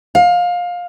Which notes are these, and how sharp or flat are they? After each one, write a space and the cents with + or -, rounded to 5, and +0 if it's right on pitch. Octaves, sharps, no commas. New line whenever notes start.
F5 +20